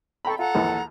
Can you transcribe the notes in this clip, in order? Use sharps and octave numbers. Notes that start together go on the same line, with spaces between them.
A4 G5 A#5 B5 C#6
F4 A4 F#5 A#5
A#1 D#2 E3